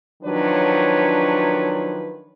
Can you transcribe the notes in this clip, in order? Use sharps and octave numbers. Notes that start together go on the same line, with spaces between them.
D#3 F3 F#3 D4 B4 C#5